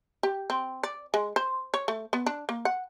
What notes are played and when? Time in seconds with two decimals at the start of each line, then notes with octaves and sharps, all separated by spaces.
0.23 G4
0.50 C4
0.83 D5
1.14 G#3
1.36 C5
1.74 C#5
1.88 A3
2.13 B3
2.26 D4
2.49 A#3
2.65 F#5